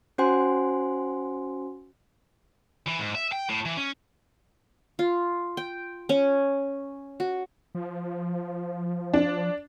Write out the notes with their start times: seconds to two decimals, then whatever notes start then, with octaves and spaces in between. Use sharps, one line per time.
0.18 C#4 F#4 C5 F#5 G#5 C6
2.86 E3
2.99 G#2
3.15 E5
3.32 G5
3.50 A2
3.66 E3
3.77 C#4
4.99 F4
5.57 G5
6.09 C#4
7.20 F#4
7.75 F3
9.13 D4